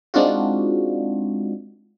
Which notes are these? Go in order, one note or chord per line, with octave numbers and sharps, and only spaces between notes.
G#3 C4 D4 D#4 F4 F#4